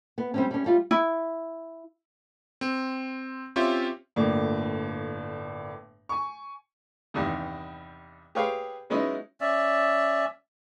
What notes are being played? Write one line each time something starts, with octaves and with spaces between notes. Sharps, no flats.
B3
G3 C4 C#4
G3 C#4
G3 F4
E4
C4
C4 C#4 F4 G4 C#5 E5
G1 A2 A#3 D4
G#5 C#6
E2 G2 C3 D#3
G4 G#4 B4 C#5 F5 G5
F#3 G#3 B3 C#4 D#4 E4
C#4 D5 E5